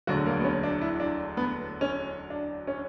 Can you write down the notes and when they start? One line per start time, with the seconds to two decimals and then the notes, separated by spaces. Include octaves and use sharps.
0.07 E1 D2 D3 F#3 F#4
0.26 A#3
0.40 B3
0.44 C#4
0.63 D4
0.82 E4
1.00 D4
1.37 B3
1.81 C#4
2.30 D4
2.67 C#4